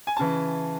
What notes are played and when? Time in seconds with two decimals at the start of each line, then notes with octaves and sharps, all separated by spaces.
0.07 G#5
0.17 C#3 E3 A5